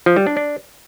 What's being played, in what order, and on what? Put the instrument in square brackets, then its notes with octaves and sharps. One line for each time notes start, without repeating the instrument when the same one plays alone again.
[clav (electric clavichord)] F3
G3
D4
D4